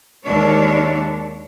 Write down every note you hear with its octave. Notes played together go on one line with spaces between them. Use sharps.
D#2 G#3 D4 C#5